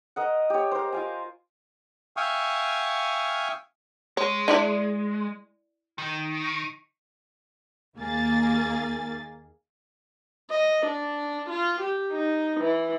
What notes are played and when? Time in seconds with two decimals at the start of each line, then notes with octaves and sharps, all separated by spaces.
0.16 A#4 D#5 F#5
0.50 G4 C#5
0.71 A#4 C5
0.92 F4 F5 G#5
2.17 E5 F5 G5 G#5 C#6 D#6
4.17 G#3 C#5
4.48 D4 E4 D5
5.98 D#3
7.97 D#2 A#3 G#4 A6
10.50 D#5
10.86 D4
11.50 F4
11.81 G4
12.12 D#4
12.60 E3